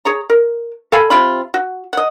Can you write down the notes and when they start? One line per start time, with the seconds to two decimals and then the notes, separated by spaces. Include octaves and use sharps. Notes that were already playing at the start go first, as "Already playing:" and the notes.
0.05 G#4 C#5 A#5
0.30 A#4
0.92 A4 F5 G#5 B5
1.10 C3 C4 F4 B5
1.54 F#4
1.93 D#5 F#5